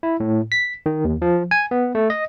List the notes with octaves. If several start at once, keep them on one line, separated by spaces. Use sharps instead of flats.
E4
A2
B6
D#3
D#2
F3
G#5
B3
A3
D#5